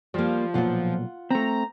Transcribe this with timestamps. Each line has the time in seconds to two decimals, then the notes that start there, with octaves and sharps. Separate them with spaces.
0.14 F3 G3 A#3
0.54 B1 A#2 F4 F#5
1.31 A3 C4 A#5